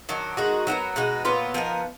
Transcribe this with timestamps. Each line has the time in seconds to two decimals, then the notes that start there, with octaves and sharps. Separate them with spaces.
0.09 D#3 F#3 D4
0.37 D#3 G#3 D#4 F#4
0.67 F#3 B3 D#4 A#4
0.96 B2 G#3 D#4 F#4
1.25 A#2 F#3 B3 F4
1.54 F3 B3 D#4 A#4